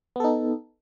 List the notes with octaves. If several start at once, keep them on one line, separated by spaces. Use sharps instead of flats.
B3 D#4 A4